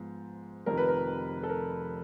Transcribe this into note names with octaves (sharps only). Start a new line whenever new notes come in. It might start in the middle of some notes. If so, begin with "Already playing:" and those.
Already playing: G#2 F3 B3
F1 F2 C3 D#3 A#4
B4
A#4
A4
A#4